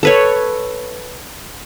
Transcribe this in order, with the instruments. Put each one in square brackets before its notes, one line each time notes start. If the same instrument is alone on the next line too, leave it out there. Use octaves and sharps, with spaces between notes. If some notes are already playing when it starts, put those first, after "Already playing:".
[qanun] A4 B4 C#5